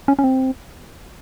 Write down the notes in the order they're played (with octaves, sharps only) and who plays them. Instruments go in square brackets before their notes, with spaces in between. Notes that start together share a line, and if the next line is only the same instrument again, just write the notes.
[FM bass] C#4
C#4
C4